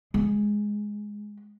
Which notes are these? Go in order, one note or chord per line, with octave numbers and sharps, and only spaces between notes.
G#3